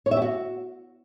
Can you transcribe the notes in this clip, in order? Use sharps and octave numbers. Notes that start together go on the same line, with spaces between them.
C#5
E5
G4
F#4